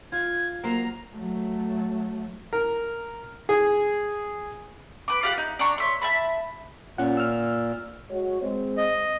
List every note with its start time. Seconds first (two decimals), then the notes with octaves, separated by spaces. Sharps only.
0.12 F4 G#6
0.64 F#3 A#3 C5 A#5
1.14 F#3 A3
2.53 A#4
3.49 G#4
5.08 B4 D6
5.23 F4 G4 F5 F#5
5.38 D#4
5.59 D4 A#5 C#6
5.78 C#5 E5 C6
6.02 E5 A5 B5
6.98 A#2 C#4 F4 F#5
7.17 E6 F6
8.09 G#3 F#4 C#5
8.41 G#3 C4
8.77 D#5